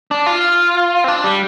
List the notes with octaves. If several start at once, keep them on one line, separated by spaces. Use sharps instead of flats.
D4
F4
C4
D4
G3